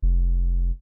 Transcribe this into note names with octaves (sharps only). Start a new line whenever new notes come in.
F1